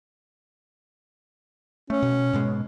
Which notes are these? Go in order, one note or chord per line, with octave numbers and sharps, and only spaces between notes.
A3 C#4
B2
G#2 B2 G#3